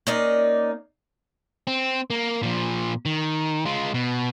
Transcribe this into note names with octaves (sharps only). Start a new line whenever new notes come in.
A#3 C#4 D#4 D5
C4
A#3
A#2 F3
D#3
G#3 F4
B2